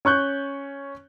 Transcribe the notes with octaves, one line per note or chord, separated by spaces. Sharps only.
C#4 C#6 F#6 G6